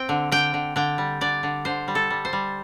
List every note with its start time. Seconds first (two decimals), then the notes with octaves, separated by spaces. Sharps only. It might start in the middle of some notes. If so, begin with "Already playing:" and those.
Already playing: C4 G5
0.09 D3
0.32 D3 G5
0.54 D3
0.76 D3 G5
0.98 G3
1.21 D3 D5
1.43 D3
1.65 D3 C5
1.88 G3
1.95 A4
2.10 G3
2.25 C5
2.33 G3